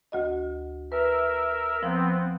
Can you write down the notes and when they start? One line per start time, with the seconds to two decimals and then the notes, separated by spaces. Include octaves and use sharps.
0.12 D2 F#4 D#5
0.92 A#4 B4 E5
1.83 F3 B3 C4